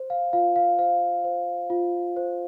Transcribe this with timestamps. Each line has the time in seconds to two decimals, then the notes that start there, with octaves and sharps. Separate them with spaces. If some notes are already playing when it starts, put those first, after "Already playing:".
Already playing: C5
0.10 F5
0.33 F4 F5
0.56 F5
0.78 C5 F5
1.24 C5
1.70 F4
2.17 C5